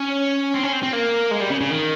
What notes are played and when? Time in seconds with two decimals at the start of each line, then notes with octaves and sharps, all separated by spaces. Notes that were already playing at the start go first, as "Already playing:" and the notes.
Already playing: C#4
0.54 C4
0.63 C#4
0.73 C4
0.83 C4
0.93 A#3
1.31 G#3
1.41 G3
1.51 C#3
1.61 C#3
1.70 D#3